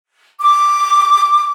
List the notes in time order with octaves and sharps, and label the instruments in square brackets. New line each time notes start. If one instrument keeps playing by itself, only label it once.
[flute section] D6